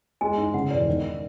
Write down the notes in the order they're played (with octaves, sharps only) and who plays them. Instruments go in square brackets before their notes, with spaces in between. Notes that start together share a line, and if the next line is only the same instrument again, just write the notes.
[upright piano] G#3 [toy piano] G#5
[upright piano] G#2
[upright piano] C#3 [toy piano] F#5
[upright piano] E1 [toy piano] D5
[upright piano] D#3